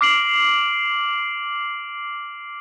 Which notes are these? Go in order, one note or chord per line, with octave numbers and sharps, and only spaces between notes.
D6 F6 C7 D7 F#7